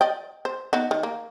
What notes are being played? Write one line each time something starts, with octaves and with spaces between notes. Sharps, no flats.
D5 D#5 G5
C5
B3 D#4 F#4
D#3
A#3